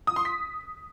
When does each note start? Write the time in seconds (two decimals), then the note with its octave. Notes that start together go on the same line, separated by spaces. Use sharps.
0.07 D#6
0.16 C6
0.25 B6